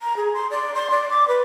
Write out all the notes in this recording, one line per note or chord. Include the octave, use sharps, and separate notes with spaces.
A#5
G#4
C6
D5
C6
D5
D6
B4